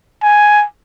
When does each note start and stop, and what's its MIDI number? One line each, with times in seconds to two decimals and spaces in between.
0.23 0.65 80